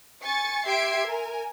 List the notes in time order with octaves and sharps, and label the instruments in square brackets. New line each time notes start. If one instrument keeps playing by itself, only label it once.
[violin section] G#5 C#6 A6 C#7
G4 E5 C6 G#6 C7 D7
A#4 G#5